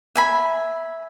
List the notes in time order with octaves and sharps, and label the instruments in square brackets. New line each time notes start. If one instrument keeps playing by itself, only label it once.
[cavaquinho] E5 G#5 B5